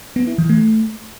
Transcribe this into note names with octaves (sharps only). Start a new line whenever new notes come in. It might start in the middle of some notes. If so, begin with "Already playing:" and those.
B3
E4
E3
A3